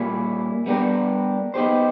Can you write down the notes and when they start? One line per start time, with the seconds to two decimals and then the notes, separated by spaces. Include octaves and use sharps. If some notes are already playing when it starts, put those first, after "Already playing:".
Already playing: A#2 G3 A#3 C#4 E4
0.66 G3 B3 D4 G4 A#4
1.54 B3 D#4 G4 C5